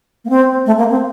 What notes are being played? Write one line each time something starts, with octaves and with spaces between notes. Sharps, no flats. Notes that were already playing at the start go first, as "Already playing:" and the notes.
A#3
C4
A3
A#3
C4